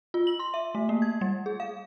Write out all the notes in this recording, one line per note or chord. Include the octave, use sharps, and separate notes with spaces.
F4
F#7
C6
E5
A3
A#3
G#6
G3
G#4
F5